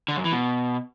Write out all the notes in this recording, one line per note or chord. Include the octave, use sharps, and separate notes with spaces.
D3
F#2
E3
B2